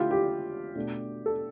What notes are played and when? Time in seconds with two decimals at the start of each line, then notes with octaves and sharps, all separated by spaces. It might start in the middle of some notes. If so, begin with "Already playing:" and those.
Already playing: D3 A3 E4 F4 G4
0.11 G4
0.75 B2 A3 D4
1.26 A4